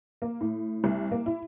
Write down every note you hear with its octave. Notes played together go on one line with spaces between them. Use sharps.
A#3
A2
C2
A#3
E4